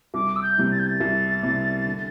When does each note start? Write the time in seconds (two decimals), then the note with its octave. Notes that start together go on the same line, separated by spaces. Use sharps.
0.14 C2 D6
0.36 E6
0.42 G6
0.57 C3 G3 E4
0.72 A6
0.79 G6
0.87 A6
1.00 C2
1.43 C3 G3 E4
1.86 D3